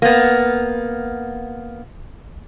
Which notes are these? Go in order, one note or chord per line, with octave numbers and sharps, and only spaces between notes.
A#3 B3